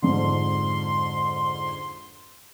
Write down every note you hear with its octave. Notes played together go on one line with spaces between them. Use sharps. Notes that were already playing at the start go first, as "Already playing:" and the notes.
F2 G#2 D3 C6